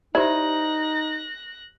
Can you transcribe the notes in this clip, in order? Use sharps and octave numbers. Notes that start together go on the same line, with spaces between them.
D#4 E4 G4 C5 D5 F#6 A#6